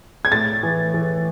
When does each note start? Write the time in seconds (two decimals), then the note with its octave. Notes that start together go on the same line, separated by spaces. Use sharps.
0.25 G#6
0.32 A2 A6
0.63 E3
0.94 E3